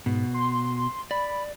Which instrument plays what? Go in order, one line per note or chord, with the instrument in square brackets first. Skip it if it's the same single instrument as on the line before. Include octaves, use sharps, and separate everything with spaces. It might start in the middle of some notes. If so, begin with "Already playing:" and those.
[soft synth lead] G#2 [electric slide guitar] B2
[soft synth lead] C6
[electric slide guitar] D5 [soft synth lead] B5